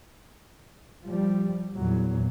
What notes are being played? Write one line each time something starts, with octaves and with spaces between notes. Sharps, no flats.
F3 G3
E2 A#2 F#3